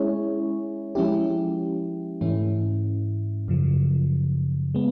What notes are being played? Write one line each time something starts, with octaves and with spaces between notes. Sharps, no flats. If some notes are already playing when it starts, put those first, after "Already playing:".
Already playing: G#3 C#4 E4 G#4 C#5
F3 G#3 C#4 E4 G4
G#2 E3 A3 C#4 E4
F#2 C#3 F3
G#3 B3